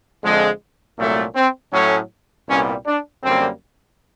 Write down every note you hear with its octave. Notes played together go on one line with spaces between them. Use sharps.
F2 D3 F3 G#3
C2 A#2 F#3 A3
C4
A2 F#3 A3 C#4
C2 A#2 G3 B3 C#4
D4
F#2 D3 G3 A#3 C4